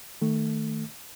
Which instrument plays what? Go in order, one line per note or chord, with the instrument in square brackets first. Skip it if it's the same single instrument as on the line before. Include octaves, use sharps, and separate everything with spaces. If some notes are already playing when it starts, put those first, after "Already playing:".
[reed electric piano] D#3 A3